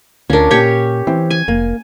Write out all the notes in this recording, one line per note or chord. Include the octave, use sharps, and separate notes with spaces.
D2 C#4 D4 F4 A#4
A#2 G4 C#5
E3 C4
G#5
F1 A#3